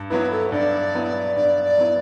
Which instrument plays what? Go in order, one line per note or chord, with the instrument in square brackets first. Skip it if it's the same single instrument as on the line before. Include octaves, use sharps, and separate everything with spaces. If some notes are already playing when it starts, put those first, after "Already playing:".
Already playing: [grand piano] G2
[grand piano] F#3 B3 E4 [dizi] B4
[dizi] A4
C#5
[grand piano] G2 [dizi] D5
[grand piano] F#3 B3 E4
[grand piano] G2 [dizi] D5
[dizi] D5
[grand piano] F#3 B3 E4